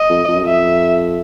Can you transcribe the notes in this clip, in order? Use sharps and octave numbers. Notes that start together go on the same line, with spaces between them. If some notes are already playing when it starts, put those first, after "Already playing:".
Already playing: D#5
F2
F2
F#2
F2 E5